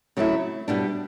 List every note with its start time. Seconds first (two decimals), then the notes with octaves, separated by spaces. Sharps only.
0.17 C#3 F#3 A3 E4
0.68 B2 G3 D4